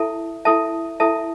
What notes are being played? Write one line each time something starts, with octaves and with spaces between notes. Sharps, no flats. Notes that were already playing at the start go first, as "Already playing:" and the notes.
Already playing: E4 A4 E5 A5
E4 A4 E5 A5
E4 A4 E5 A5